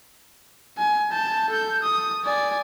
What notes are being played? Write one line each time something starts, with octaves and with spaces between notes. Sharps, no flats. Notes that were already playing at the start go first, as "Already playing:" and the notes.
G#5
A5 G6
A4 G6
D#6
D5 G#5